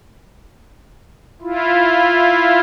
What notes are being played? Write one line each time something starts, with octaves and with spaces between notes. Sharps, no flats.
E4 F4